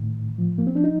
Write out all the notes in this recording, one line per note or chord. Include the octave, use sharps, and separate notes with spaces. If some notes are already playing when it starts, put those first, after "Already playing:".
Already playing: A2 D#3
F3
A#3
C4
D4
D#4